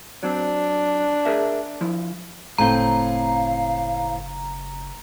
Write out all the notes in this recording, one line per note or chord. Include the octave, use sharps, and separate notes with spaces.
F#3 C4 D4
G#4 A#4 E5
F3 E4
F#1 A2 C4 F5 G5 A#5